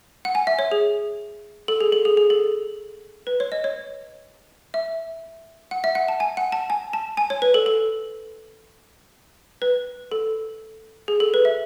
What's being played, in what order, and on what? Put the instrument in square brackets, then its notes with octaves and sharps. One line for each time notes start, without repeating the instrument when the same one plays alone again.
[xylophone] F#5
G#5
E5
C#5
G#4
A4
G#4
A4
G#4
G#4
A4
B4
C#5
D#5
C#5
E5
F#5
E5
F#5
A5
G#5
F#5
A5
G#5
A5
G#5
C#5
B4
A4
A4
B4
A4
G#4
A4
B4
E5